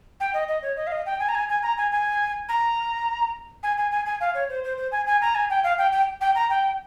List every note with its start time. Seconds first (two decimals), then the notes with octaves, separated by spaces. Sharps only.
0.20 G5
0.34 D#5
0.48 D#5
0.62 C#5
0.76 D#5
0.87 F5
0.92 D#5
1.06 G5
1.19 G#5
1.28 A#5
1.34 G#5
1.49 G#5
1.63 A#5
1.77 G#5
1.91 G#5
2.49 A#5
3.63 G#5
3.77 G#5
3.91 G#5
4.06 G#5
4.20 F5
4.34 C#5
4.49 C5
4.64 C5
4.77 C5
4.92 G#5
5.07 G#5
5.21 A#5
5.35 G#5
5.50 G5
5.63 F5
5.78 G5
5.92 G5
6.21 G5
6.35 A#5
6.50 G5